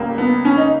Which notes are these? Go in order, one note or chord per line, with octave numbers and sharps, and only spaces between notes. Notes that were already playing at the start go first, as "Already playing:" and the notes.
Already playing: C#2 C#3 G3 A#3
B3
C#4
D#4